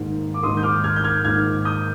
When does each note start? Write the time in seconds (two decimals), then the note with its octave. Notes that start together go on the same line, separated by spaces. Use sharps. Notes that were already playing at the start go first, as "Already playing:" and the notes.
Already playing: G#2 D#3 A#3
0.34 D6
0.43 G#2 D#3 A#3 C6 D#6
0.57 G6
0.63 D6 F6
0.84 F6 G#6
0.96 G6
1.04 F6 G#6
1.25 G#2 D#3 A#3 F6 G#6
1.65 D#6 G6